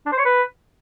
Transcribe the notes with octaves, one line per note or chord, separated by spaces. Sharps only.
D4
C5
C#5
B4